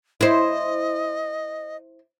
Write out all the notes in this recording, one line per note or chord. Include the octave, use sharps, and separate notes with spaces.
E4 C5 D#5